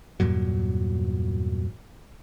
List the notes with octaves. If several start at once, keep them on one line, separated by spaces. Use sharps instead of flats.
E2 G2 A#2 F#3